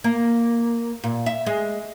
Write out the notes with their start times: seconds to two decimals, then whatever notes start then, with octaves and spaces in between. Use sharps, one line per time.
0.04 A#3
1.04 A#2
1.26 E5
1.46 G#3